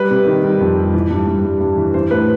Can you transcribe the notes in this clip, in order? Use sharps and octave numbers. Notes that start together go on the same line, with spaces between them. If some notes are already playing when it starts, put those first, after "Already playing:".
Already playing: G3 B4
C3
D#3
G3
F2
G3
E3
G2
G2
G3
G2
E3
E3 C5
A2 B4